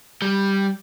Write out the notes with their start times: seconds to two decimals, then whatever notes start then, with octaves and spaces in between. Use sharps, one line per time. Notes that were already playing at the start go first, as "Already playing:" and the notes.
0.22 G3